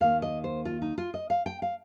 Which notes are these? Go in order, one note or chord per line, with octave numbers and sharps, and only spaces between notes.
D#2 D#3 A#3 F5
D#5
C5
F4
D#4
F4
D#5
F5
G5
F5